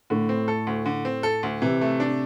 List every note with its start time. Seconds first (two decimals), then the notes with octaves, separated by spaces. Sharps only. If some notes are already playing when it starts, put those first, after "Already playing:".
0.10 A2 D3
0.29 C4
0.48 A4
0.67 D2
0.86 D3
1.05 C4
1.23 A4
1.43 D2
1.62 C3 E3
1.81 A3
2.00 D4